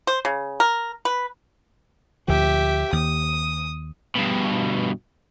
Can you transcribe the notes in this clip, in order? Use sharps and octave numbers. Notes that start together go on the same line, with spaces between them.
C5
C#3
A#4
B4
D2 A#2 F3 G4 E5
D#2 D#6
G2 B2